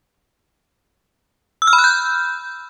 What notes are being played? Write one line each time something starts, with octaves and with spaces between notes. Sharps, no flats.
E6
F6
B5
F#6
G6